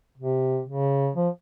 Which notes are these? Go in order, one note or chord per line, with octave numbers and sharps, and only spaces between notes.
C3
C#3
F3